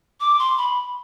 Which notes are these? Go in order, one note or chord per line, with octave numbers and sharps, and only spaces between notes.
D6
C6
B5